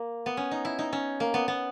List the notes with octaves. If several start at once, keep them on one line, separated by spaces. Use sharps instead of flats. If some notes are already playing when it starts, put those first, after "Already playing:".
Already playing: A#3
B3
C#4
D#4
E4
D#4
C#4
A#3
B3
B3